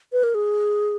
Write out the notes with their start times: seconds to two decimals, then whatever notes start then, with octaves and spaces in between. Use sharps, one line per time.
0.13 B4
0.23 A#4
0.35 G#4